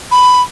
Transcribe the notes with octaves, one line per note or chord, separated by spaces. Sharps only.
B5